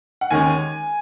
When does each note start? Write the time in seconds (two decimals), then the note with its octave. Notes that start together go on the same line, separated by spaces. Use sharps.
0.21 F#5
0.31 D#2 D#3 G#3 C#4 G#5